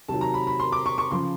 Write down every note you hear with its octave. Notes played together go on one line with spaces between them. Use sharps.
C3 D#3 F#3 A5
A#5
B5
B5
C6
D6
C#6
C#6
C#3 F3 C6